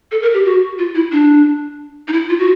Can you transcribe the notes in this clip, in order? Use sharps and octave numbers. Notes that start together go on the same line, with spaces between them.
A4
A#4
G4
F#4
F4
E4
D4
D#4
E4
F4
F#4